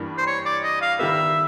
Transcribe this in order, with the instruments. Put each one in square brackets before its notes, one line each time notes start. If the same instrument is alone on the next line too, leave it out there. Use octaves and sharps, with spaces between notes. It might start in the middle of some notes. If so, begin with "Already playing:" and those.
Already playing: [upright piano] G2 E3 G3 A#3 D4
[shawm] C5
C#5
D5
D#5
F5
[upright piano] D#3 G3 B3 [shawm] E5